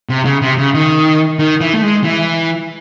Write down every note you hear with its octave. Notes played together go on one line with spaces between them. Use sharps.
C3
C#3
C3
C#3
D#3
D#3
E3
A3
G#3
E3